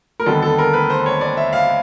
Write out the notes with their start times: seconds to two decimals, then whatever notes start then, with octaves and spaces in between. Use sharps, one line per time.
0.20 A#4
0.26 D#2 D3 G3 B3 A4
0.42 A4
0.58 A#4
0.73 B4
0.90 C5
1.06 C#5
1.21 D5
1.37 E5
1.53 F5